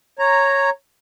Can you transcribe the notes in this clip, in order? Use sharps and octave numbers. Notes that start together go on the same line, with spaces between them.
C#5 A#5